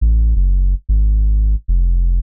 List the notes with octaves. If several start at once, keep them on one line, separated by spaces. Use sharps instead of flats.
A1
F#1
G#1
F1